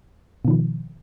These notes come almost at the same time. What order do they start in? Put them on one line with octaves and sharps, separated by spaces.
B2 D#3 F3